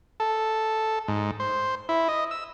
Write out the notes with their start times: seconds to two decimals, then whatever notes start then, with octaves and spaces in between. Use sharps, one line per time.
0.20 A4
1.08 G#2
1.40 C5
1.89 E4
2.09 D#5
2.31 E6